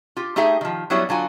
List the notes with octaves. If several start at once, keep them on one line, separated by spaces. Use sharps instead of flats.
F4 G4
A3 D#4 G4 G#4 E5
D#3 F3
F#3 G3 B3 E4 F#4 C#5
D3 F#3 F4 G#5